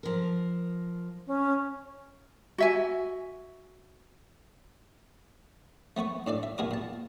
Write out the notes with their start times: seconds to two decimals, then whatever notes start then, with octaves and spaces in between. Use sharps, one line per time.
0.03 F3 A#4
1.27 C#4
2.58 F#4 E5 G#5
5.97 A3 B3 B4 C#6
6.27 A2 D4 A4 D5
6.43 E5
6.58 A#2 B3 G#4 A#4 D6
6.71 A#2 A5